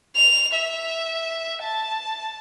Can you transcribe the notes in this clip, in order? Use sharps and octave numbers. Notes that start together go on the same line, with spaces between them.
F7
E5
A5